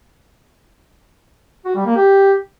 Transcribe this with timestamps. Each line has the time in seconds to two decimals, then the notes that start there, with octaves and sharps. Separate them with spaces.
1.65 F#4
1.75 G3
1.86 A#3
1.96 G4